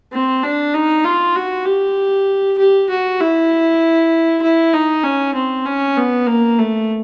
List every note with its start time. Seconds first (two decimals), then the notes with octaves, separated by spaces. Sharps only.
0.12 C4
0.43 D4
0.73 D#4
1.04 F4
1.36 F#4
1.65 G4
2.58 G4
2.89 F#4
3.20 E4
4.42 E4
4.73 D#4
5.03 C#4
5.34 C4
5.65 C#4
5.96 B3
6.27 A#3
6.58 A3